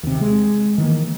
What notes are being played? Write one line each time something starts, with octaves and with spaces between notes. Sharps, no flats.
D#2 C3
G#3
D#3 E3 A#3